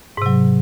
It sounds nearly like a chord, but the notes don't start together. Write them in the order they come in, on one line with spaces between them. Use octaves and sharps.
G#2 C3 F#3